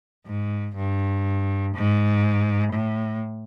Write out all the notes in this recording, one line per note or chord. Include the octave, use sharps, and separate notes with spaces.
G#2
G2
G#2
A2